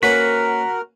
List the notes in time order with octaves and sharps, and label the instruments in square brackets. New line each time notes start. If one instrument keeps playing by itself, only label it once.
[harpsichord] A#3 C#4 B4 [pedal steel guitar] F#4 F#5 [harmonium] A#4 [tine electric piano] B6